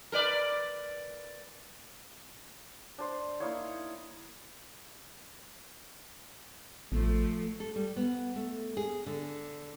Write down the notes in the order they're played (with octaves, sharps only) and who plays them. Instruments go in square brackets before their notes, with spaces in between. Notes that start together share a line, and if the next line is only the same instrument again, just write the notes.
[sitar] A#4 B4 D5
[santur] D4 C5
A#3 D#4 E4 C#5
[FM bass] A1 [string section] F3 A3
[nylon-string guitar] A4
G3
B3
A3
G#4
D3